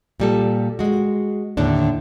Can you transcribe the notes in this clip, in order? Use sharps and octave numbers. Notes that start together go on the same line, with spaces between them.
A#2 G3 A4
G#3 F#4
D#2 A2 D3 D4